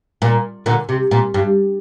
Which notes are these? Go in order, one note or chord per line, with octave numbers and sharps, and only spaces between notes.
A#2
A#2 D3
C3
A#2
G2